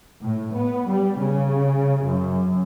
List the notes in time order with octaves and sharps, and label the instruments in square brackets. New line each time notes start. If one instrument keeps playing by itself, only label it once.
[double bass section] A2
B3
G3
C#3
F#2